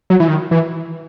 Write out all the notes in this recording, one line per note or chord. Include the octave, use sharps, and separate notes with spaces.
F#3
E3
D#3
E3